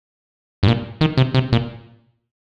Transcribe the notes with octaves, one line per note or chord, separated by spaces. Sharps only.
G2
A#2
D#3
C3
C3
A#2